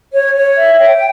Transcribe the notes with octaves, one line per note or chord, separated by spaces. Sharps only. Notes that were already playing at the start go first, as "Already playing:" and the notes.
C#5
C#5
E5
G5